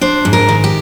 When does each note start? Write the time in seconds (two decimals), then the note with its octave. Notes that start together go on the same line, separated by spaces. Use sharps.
0.01 D4 C5
0.25 G#2
0.33 A#4
0.49 D#3
0.64 G4